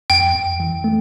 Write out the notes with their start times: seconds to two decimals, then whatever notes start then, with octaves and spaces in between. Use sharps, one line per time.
0.10 F2 G5
0.35 F2
0.60 E3
0.84 A3